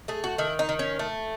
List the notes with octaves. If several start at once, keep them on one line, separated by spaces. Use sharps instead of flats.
A3 G#4
F#4
D#3 E4
D#4
D#3
C#4
A3